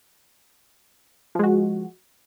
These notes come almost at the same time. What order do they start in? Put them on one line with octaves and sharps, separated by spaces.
F3 G#3 F#4